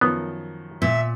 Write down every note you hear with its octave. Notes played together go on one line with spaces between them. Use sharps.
F#2 D#3 F3 B3
A#2 E5